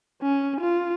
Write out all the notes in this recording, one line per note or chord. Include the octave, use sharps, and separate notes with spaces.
C#4
F4